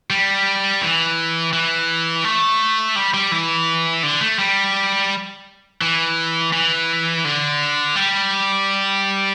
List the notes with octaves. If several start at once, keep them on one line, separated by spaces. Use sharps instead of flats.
G3
E3
E3
A3
G3
G3
E3
D3
A3
G3
E3
E3
D3
G3